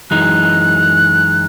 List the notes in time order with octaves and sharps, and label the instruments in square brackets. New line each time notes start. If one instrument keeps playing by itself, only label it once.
[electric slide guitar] F#2 E3 G#3 D#4 [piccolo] F#6